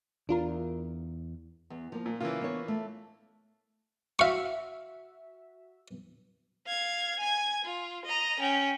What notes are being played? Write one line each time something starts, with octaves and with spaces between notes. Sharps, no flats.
E2 D4 F4 A#4
E2
F3 A#3
A#2
C#3 E3 A#3 F4
B3 D4 C#5
A3
F#4 E5 F5 C#6
F5 G#6
G#5 G#6
F4
D#5 A#5
C#4 G5